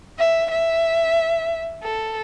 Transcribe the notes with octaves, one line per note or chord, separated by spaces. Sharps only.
E5
E5
A4